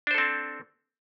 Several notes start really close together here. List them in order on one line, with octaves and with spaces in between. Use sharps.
D4 C5 A4 C4